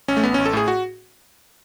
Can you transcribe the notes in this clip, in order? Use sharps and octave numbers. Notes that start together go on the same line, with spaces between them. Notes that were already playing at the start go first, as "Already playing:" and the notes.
A1 C#4
A3
A1 B3
A1 C#4
A4
A2 G#4
F#4